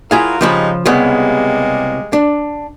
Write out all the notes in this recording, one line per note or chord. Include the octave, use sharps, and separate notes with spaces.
F#3 E4 F4 G#4 A#4 F5
C#3 F3 G3 G#3 D#4 B5
C2 C#3 G3 G#3 A#3 B3
D4